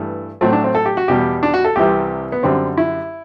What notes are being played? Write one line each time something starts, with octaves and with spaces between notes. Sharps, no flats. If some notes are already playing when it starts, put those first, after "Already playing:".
Already playing: G2 E3 A3
A2 F#3 A3 C4
D4
C4
A4
G4
F#4
E2 B2 G3 G4
D4
F#4
A4
C2 C3 E3 G3 G4
B3
F#2 D3 G3 C4
E4